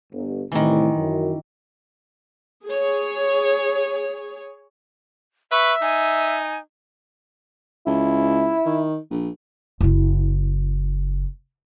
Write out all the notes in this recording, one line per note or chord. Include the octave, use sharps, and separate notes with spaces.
G1
C2 A2 D#3 E3
F#2
G#4 C#5
B4 E5 C#6
D#4 G#5
C#2 E4
D#3
A#1
F#1 E4